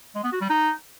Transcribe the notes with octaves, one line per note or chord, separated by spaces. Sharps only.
G#3
B3
F#4
G3
D#4